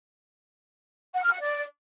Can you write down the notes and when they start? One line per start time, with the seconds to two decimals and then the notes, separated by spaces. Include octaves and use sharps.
1.14 F#5
1.23 F6
1.31 F#5
1.40 D5